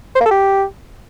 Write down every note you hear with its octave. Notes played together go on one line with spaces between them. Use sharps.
C5
A#3
A4
G4